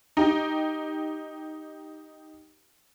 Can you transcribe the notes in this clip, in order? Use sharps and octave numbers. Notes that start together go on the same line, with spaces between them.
D#4 G4